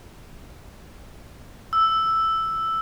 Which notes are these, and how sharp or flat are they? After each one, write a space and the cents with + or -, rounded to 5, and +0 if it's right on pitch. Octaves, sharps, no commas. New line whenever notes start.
E6 +0